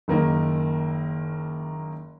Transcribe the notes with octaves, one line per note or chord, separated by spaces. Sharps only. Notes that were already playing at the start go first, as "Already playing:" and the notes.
F#1 D#3 A#3